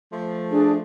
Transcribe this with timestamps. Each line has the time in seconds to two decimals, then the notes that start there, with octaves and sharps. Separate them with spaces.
0.12 F3 A3
0.50 D4 G#4